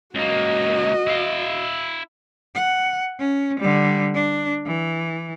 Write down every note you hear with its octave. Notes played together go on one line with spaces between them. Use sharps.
C#2 A#3 F#4 D#5
E4 F5
F#5
C#4
D3 G3
D4
E3